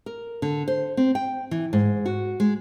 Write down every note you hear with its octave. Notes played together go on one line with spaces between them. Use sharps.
A#4
D3
C5
C4
G5
E3
G#2
F#4
G#3